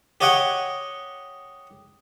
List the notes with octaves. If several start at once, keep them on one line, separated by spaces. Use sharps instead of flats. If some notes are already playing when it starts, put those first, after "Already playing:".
G4 C#5 D#5 F#5 G5